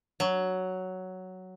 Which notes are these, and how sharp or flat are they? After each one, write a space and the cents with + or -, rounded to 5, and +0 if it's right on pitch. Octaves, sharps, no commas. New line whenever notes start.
F#3 +5